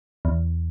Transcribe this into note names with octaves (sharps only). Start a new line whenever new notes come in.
E2